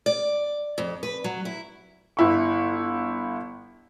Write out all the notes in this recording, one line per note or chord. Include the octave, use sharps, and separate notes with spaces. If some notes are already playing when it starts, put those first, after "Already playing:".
D5
F2
B4
F#3
E4
G1 E4 C#6